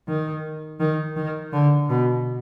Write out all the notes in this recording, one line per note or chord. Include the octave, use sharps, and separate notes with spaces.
D#3
D#3
D#3
D3
B2